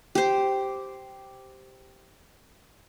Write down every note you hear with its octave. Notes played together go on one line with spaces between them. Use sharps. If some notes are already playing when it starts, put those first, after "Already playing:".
G4 C5